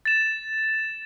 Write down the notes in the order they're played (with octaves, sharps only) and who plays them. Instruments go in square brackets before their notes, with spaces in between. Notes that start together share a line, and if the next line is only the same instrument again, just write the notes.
[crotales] A6 E7